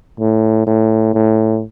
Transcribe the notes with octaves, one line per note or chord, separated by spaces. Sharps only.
A2
A2
A2